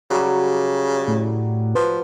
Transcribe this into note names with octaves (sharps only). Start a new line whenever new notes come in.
C#3 F#3 G3 G4
A2
F3 B4